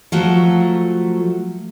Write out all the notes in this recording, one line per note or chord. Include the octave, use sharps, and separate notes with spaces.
F3 F#3 A3